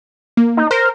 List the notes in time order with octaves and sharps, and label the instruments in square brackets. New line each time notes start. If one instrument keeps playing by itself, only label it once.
[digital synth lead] A#3
[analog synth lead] D#4
[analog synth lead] A#4 [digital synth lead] C5